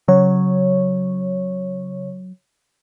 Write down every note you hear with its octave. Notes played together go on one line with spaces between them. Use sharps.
C#3 F#3 C#5